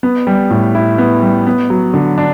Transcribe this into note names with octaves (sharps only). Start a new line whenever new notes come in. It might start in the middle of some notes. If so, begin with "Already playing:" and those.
B3
G3
A2
E4
B3
G3
B3
F#3
D3
D4